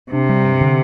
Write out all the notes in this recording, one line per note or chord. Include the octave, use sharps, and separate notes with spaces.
C3 D4
G3
G2
D3